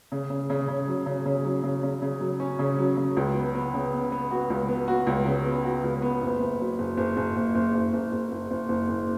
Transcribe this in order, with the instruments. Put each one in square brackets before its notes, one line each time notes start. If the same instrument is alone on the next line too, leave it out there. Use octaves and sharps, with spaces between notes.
[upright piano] C#3
C#3
C#3
C#3
F#3
C#3
C#3
F#3
C#3
C#3
C#3
F#3
C#4
C#3
F#3
C#3
C#2
B3
B3
C#3
B3
B3
F#4
C#2
B3
F#4
C#2
C#3
B3
F#4
C#2
B3
F#1
F#1
F#3
F#1
F#1
F#1
F#1
F#1
F#1
F#1
F#1
F#1
F#1
F#1
F#1